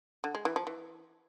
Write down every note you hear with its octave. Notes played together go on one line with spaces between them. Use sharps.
D3
G#3
E3
F3
E3